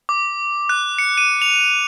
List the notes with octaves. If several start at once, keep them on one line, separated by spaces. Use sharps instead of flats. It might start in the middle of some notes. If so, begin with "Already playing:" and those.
D6
F#6
C#7
D#7
F7